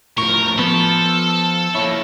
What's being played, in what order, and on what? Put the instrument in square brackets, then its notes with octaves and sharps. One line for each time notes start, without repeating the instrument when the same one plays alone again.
[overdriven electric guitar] A2 F3 [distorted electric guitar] A#4 [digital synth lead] C#6
[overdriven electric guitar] F3 [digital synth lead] B3 [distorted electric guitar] A4
[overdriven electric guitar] A#3 E4 [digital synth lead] C#5